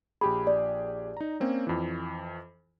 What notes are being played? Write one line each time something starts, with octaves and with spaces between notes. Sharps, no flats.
A#1 G4 G#4 B5
D5
D#4 A#5
A#3 C4 C#4
F2 E3